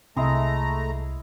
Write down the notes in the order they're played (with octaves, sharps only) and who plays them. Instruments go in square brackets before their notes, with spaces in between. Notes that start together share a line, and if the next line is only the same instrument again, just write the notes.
[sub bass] C2 [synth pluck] C3 [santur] G#3 E4 G#4 [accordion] A3 A#5